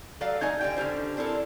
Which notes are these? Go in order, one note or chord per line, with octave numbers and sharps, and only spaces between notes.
F#3 A4 D5 F5
A3 D#4 D#5 G#5
D3 G3 G5
D3 G3 C#4 E4 C5
C4 D4 E4 A4 A#4